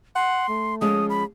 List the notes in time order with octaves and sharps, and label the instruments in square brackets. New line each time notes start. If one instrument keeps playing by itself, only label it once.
[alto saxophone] F#5 [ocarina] C6
[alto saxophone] A3
[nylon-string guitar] F3 G#3 C#4 [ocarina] D#6
[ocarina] B5